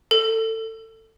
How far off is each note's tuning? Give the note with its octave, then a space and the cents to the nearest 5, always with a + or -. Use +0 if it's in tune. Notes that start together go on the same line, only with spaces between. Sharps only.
A4 +20